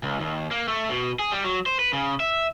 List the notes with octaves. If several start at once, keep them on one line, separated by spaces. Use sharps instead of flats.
C#2
D#2
A#3
A3
B2
G#4
G3
F#3
C5
B4
C#3
E5